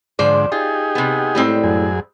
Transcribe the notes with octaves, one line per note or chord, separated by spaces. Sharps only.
G#2 D3 F3 C5 D5
D#4 F4 G4 G#4
C3 B3
A2 G3 G#3 C4
F#2 G#4